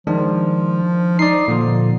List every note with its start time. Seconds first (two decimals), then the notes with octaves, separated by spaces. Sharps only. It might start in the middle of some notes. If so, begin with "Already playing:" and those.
0.07 D#3 F3 G#3 D4
1.19 D#4 D5 C7
1.48 A#2 D3 F3